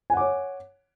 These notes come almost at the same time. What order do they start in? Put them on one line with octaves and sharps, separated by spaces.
G#5 F#5 D6 C#5